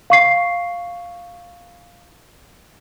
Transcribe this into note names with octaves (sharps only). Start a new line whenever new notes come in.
F5 C#6 C7